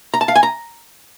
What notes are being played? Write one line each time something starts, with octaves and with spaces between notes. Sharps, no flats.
A#5
A5
F5
G#5
A#5